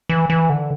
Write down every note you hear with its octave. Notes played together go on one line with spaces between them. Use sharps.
E3
E3
D3